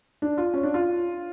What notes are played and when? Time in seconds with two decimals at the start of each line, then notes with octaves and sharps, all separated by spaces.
0.22 D4
0.38 F4
0.54 C#4
0.63 D4
0.74 F4